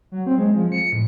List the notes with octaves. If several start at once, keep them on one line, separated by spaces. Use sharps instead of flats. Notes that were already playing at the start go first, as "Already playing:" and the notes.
F#3
C4
G#3
F3
C#7
A2